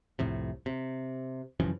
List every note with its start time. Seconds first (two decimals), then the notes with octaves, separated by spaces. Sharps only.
0.19 C2 F2 A2 C3
0.66 C3
1.60 F#2 C#3 E3 F3